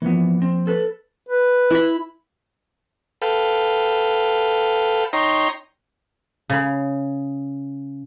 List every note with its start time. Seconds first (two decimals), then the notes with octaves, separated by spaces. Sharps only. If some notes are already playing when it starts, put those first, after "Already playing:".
0.02 E3 F3 A#3 B3
0.42 C4
0.67 A4 B4
1.29 B4
1.70 E4 B5
3.22 A4 B4 F5 G5
5.13 D#4 C#5 G5 A#5 C6
6.50 C#3 B5